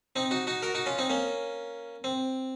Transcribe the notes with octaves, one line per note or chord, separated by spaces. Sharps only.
C4 D#4
D#4 F#4
D#4 F#4
F#4 A#4
D#4 F#4
C#4 F4
C4 D#4
A#3 C#4
C4